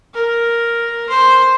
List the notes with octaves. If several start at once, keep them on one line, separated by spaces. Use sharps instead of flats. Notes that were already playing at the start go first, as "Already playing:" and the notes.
A#4
C5